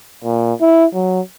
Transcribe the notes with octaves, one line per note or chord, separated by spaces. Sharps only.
A#2
E4
F#3